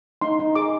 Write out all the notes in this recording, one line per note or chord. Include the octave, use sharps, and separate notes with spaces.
D#4 C6
D#4
G#4 D6